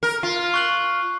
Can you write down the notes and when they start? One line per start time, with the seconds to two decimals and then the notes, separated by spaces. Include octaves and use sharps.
0.03 A#4
0.23 F4
0.54 C#6 F#6 F#7